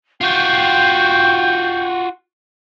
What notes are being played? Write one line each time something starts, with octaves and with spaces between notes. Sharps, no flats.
F4 F#4 G5 G6